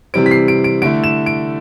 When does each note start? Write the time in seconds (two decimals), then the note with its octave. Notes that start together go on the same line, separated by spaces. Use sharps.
0.14 C3 E3 G3 C4 D7
0.26 B6
0.31 C7
0.48 D7
0.64 D7
0.82 D3 A3 E4 D7
1.04 E7
1.26 D7